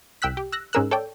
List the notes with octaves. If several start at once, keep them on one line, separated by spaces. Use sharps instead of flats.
C2 G5 E6 F#6 B6
G4
E6 F#6 A#6
G#2 C#4 G#4 A#4 E6 F#6
A4 C#5 D5 G5